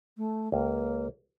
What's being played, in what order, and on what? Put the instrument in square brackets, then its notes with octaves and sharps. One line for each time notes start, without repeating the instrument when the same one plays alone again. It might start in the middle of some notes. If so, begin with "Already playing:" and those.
[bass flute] A3
[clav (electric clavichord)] C#2 [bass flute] A#3